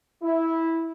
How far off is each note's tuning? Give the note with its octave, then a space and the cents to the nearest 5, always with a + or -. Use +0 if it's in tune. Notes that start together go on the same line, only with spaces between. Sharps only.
E4 -10